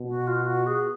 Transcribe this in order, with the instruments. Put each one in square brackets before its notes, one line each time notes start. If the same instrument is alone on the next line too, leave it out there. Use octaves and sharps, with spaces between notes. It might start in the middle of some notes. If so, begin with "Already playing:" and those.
Already playing: [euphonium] B2
[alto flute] F#4
F4
F#4
G#4